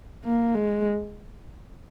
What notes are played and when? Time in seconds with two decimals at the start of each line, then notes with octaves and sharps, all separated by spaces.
0.25 A#3
0.55 G#3